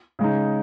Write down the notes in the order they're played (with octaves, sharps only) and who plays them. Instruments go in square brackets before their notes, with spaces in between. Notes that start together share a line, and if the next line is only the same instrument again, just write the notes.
[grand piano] C#3 G#3 D#4